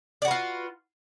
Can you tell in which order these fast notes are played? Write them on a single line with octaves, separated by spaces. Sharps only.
D5 F#4 B4 F4